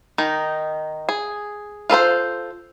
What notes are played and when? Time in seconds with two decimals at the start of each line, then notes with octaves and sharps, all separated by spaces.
0.18 D#3 D#4
1.09 G#4
1.90 F4 A4 B4 C5